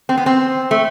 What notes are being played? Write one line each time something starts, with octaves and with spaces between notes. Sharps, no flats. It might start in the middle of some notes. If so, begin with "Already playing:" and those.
C4
B3
C4
A3